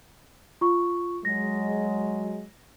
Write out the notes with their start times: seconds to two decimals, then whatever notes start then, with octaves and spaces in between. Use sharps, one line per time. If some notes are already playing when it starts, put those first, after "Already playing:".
0.61 F4 C#6
1.25 F#3 G#3 A#6